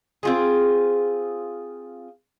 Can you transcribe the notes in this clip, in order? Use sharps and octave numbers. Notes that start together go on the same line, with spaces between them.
C4 F4 G#4